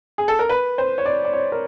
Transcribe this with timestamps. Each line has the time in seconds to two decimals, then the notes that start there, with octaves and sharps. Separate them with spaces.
0.18 G#4
0.28 A4
0.39 A#4
0.49 B4
0.78 C5
0.98 C#5
1.06 D5
1.24 D5
1.33 C#5
1.52 A#4